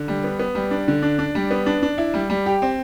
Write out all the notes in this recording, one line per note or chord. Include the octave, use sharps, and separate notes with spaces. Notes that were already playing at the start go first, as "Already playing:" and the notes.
Already playing: D3
G3
B3
B3
G3
D4
D3
D4
D4
G3
B3
D4
D4
E4
G3
G3
G4
C4